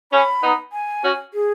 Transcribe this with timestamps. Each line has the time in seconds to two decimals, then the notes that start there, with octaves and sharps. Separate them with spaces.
0.12 C#4 B5
0.43 B3 D#4
0.73 G#5
1.03 C#4 F#4
1.34 G#4